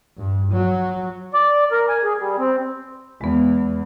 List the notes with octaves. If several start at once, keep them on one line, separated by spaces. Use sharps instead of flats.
G2
F#3
D5
A#4
G#5
G#4
G3
C4
E2 G#3 B3